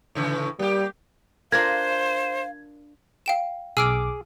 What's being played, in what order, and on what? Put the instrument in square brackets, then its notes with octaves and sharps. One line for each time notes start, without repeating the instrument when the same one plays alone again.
[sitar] A2 C#3 E3
[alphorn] G3 [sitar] A#3 G4
[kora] D4 F4 A#4 [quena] C5 [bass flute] F5 [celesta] G#6
[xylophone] F5 G5 E7
[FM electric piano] B1 D6 [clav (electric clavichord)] G#4 [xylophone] E6 F6 D7